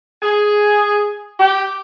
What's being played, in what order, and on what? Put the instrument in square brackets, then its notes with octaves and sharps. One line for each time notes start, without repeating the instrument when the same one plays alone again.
[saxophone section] G#4
G4